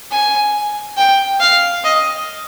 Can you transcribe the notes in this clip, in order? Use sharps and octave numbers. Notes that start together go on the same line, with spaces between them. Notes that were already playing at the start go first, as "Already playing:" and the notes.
G#5
G5
F5
D#5